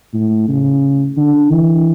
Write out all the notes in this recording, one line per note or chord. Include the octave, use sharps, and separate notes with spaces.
A2
C#3
D3
E3